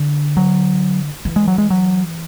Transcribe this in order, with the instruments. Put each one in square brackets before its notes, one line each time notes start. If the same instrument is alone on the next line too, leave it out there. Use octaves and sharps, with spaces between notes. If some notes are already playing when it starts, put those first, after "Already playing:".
Already playing: [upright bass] D3
[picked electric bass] F#3
[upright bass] E3
[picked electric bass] G#3
F#3
G#3
F#3